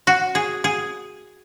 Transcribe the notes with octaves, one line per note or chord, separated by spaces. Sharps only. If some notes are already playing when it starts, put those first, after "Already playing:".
F#4
G#4
G#4